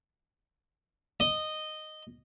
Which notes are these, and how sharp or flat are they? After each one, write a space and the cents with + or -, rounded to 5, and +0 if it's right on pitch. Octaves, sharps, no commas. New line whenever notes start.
D#5 -10